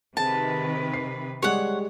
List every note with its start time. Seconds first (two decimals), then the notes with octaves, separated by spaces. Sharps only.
0.17 C3 D#3 G#4 B4 A5
0.94 C7
1.42 G3 G#3 C#5 D5 F#5